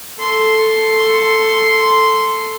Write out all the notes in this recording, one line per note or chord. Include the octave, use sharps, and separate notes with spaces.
A4 C6